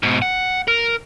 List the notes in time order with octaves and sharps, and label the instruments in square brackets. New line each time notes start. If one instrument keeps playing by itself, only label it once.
[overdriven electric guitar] G#2 B2
F#5
A#4